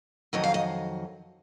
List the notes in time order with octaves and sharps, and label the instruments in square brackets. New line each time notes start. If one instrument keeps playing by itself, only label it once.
[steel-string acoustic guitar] F2 D#3 F#3 D#5
F5
D#5